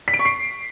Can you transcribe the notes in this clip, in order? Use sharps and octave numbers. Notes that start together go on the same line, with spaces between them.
B6
D7
C#6
C7